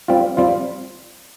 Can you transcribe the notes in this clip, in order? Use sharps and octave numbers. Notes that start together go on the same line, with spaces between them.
G3 C4 F4
G3 C4 F4